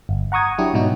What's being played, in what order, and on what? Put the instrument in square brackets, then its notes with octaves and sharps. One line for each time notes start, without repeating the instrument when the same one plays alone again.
[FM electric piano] G1
F#5 A#5 C#6 D#6 G#6
F#3 D4 E4 G4
G#2 B2 F#3 D#4 F#4